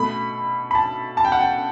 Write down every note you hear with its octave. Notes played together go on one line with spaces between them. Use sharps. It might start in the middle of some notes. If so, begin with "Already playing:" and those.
Already playing: B2 A3 B5
B5
A5
A5
G5
F#5
G5